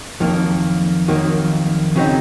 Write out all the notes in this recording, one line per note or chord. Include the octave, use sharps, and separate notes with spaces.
F2 D#3 F#3 A#3
F2 D#3 F#3 A#3
C#3 F#3 C4 D#4